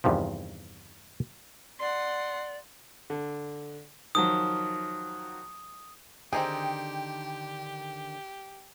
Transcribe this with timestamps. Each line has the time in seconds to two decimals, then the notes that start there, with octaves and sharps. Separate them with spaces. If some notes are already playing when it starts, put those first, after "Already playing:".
0.04 E2 G2 C3 D#3 F3
1.80 D5 F#5 C6
3.10 D3
4.15 D#3 F3 F#3 D#6
6.33 D3 D#3 C4 D4 D#4 G4 G#4 G5